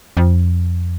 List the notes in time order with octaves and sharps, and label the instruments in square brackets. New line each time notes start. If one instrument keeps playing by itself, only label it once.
[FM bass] F2